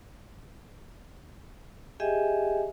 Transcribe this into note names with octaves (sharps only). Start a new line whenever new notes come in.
G4 G#4 D#5 E5 G5 G#5